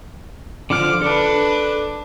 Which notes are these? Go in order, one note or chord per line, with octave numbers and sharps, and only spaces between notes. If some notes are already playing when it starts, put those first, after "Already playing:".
D3 F3 D6 F6
D4 A4 B4